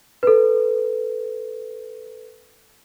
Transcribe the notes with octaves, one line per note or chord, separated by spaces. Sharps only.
A4 B4